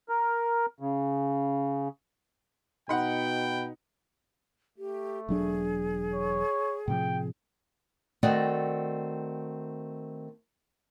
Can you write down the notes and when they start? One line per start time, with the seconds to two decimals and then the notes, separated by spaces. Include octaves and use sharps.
0.09 A#4
0.80 C#3
2.89 B2 D#4 F#5 G5 B5
4.78 A3 G4
5.29 E1 F#3 D4 G#4
6.14 C#5
6.88 A2 C3 F3 G5
8.23 D#3 A3 C4 F#4 D5 D#5